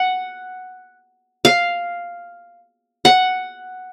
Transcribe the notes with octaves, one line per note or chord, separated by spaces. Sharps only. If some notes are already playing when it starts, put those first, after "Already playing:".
Already playing: F#5
F5
F#5